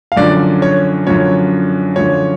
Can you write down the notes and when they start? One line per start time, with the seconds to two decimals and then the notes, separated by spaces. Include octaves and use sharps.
0.12 F5
0.16 F#2 D3 F3 D5
0.62 C#5
1.07 F#2 D3 F3 C#5
1.96 F#2 D3 F3 C#5